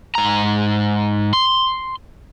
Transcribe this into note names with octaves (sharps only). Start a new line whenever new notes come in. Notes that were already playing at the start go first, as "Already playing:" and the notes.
G#2 A#5
C6